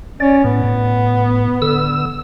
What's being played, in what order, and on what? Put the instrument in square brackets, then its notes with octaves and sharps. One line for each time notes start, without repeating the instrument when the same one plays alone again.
[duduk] C#4 [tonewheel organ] D5
[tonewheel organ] A2 [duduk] B3
[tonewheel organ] A2
D3 E6